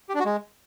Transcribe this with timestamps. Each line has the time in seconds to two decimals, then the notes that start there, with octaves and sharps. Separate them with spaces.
0.09 G4
0.14 D4
0.20 F#4
0.25 G#3